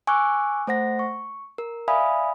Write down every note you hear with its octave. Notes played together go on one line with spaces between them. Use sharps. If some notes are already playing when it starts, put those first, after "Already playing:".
G#5 C#6 D6 E6 F#6
A3 C5 F#5 A#6
C#6
A#4
D5 E5 F5 G#5 B5 D#6